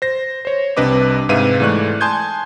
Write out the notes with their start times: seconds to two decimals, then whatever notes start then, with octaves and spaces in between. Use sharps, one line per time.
0.02 C5 A#6
0.45 C5 C#5
0.77 C2 C3 D4 B4 D#5 D6
1.29 G#2 C3 B4 E5 F5 D#7
1.60 G#2 E3 A3 D5 C#6 F#6
2.01 G#5 A5 C6 D#6 G6 G#6